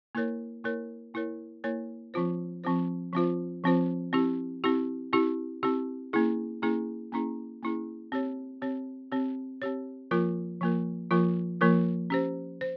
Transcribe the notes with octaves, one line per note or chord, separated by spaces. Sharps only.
A#3 E4 A#4 C#5
A#3 E4 A#4 C#5
A#3 E4 A#4 C#5
A#3 E4 A#4 C#5
F3 C4 F4 C5
F3 C4 F4 C5
F3 C4 F4 C5
F3 C4 F4 C5
C4 E4 G4
C4 E4 G4
C4 E4 G4
C4 E4 G4
A#3 C#4 E4 G#4
A#3 C#4 E4 G#4
A#3 C#4 E4 G#4
A#3 C#4 E4 G#4
C4 G4 C#5
C4 G4 C#5
C4 G4 C#5
C4 G4 C#5
F3 A#3 F4 A#4
F3 A#3 F4 A#4
F3 A#3 F4 A#4
F3 A#3 F4 A#4
C#4 G4 C5
C5